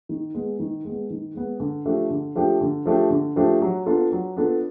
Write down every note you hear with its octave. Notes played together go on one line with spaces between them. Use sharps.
D#3
G#3 B3
D#3
G#3 B3
D#3
G#3 B3
D3
F3 A3 D4 G4
D3
F3 A3 D4 G4
D3
F3 A3 D4 G4
D3
F3 A3 D4 G4
F#3
B3 D4 F4 A4
F#3
B3 D4 F4 A4